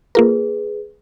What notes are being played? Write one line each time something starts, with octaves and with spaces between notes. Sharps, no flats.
A#3 F4 G#4 A#4 B4